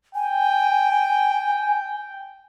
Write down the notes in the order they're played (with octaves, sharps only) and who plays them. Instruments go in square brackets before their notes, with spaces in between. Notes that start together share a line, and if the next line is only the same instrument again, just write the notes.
[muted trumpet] G5 [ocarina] G#5